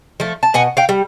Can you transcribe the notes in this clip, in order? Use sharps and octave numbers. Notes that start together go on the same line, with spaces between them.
F3 A3
A5
B2 F#5 G#5
F5 G5
G3